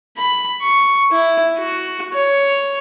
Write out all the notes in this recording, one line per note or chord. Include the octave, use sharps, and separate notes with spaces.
B5
C#6
E4
F#4
C#5